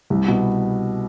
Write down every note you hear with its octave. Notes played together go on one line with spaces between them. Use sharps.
C2
B2